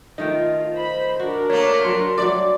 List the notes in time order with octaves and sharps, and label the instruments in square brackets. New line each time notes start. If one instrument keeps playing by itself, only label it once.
[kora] D#3 A3 G5 [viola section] F4 [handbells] D#5
[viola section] C5 B5
[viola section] D4 A#4 [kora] F#4
[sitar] A3 A#3 [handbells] C#5
[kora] F#3 [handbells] C6
[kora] F#3 G3 A3 [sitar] D5